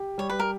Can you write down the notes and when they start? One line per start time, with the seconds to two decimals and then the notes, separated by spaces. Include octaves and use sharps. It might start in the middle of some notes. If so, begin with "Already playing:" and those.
Already playing: G4
0.18 G3 C#5
0.30 B4
0.39 A#4